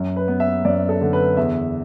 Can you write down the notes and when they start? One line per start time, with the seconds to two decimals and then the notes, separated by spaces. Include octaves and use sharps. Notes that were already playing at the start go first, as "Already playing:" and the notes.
Already playing: F#2
0.16 B4
0.28 B3
0.40 E5
0.65 F#2 D5
0.89 A4
1.01 D3
1.13 B4
1.37 E2 E5